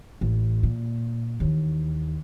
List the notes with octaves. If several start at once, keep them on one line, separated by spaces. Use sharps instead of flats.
A1
A#2
D#2 E3